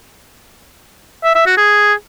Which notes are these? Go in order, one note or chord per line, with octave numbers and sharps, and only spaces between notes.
E5
E5
F#4
G#4